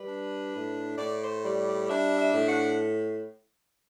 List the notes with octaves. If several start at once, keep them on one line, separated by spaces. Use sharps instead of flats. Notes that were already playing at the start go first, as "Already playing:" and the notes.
Already playing: G3 B4
D4
A2
A2 D5
C5
G3 D5
D5
D4 E5
E5
A2
F#5